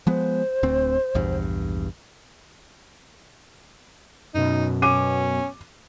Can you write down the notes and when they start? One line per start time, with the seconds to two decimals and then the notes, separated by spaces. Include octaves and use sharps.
0.07 F3 G#3 B3 C5
0.63 D1 D2 C4
1.15 A#1 E2 G2
4.34 F#2 B2 D#4
4.82 C#4 D6 D#7